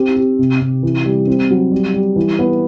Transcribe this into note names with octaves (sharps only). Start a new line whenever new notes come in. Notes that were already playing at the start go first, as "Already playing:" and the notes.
Already playing: C4 G4
G4
C3
C3
E3
G3
C4
F#3
G3
G3
E3
B3